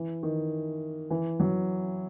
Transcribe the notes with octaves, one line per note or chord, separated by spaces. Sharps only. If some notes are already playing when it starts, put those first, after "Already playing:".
Already playing: E3
D#3
E3
F#3